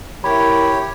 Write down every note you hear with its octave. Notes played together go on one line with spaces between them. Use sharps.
E4 G4 A#4 C#5 B5